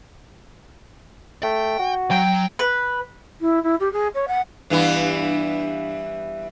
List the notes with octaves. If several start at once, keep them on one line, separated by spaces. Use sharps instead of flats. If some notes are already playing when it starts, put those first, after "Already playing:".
A3 G5
F#4
F#3 G5
B4
E4
E4
G4
G#4
C#5
F#5
G2 E3 B3